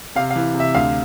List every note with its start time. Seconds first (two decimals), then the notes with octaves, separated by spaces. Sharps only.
0.16 C3 F5
0.31 F5
0.36 E3
0.55 C3
0.60 E5
0.75 D2 F5